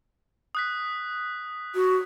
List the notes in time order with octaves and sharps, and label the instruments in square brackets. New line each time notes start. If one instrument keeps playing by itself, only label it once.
[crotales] D#6 F#6 B6
[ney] F#4